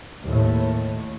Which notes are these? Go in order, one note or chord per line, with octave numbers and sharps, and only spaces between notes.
D#2 A2